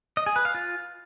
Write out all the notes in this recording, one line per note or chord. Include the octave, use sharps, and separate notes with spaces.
D#5
G#4
B4
F5
F4